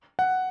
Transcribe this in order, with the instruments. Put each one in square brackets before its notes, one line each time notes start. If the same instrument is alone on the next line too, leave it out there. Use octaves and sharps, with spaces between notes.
[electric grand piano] F#5